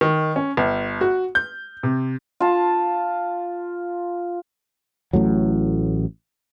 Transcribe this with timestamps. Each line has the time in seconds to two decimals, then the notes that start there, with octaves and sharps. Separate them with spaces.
0.01 D#3
0.36 C#4
0.57 G1
1.01 F#4
1.35 G6
1.83 C3
2.40 F4 A5
5.13 A1 A2 F#3